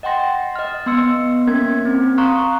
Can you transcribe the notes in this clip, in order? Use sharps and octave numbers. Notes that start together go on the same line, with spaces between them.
D#5 F#5 G5 C6 A#6
D#5 F6
B3 C6 E6 C#7
A#3 C#4 A#4 G#6
C4
F5 A#5 C6 C#6 D#6 F#6